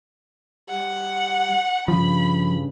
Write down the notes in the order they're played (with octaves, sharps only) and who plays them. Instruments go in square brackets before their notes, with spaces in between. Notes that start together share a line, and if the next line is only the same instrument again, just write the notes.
[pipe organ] G3 [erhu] F#5
[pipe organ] G2 C#3 [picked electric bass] F3 [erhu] B5